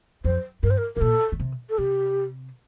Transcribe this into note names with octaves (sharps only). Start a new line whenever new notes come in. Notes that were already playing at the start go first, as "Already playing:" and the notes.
F2 C5
G2 A#4
C5
A#4
A2 A#4
A#2 A4
D3
C3
A4
C3 G4